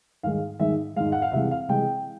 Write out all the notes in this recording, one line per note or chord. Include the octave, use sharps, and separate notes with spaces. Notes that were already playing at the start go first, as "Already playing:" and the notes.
G#2 D#3 G#3 F5
G#2 D#3 G#3 E5
G#2 D#3 G#3 F5
F#5
F5
C3 E3 G#3 E5
F5
C3 E3 G#3 G5